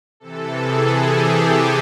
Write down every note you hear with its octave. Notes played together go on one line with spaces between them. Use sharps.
C3 E3 A4
G#4
G4